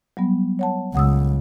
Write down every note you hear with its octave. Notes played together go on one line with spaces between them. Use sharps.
F#3 G3 B3
C#5 F#5 A5
C#2 F#5 D#6 E6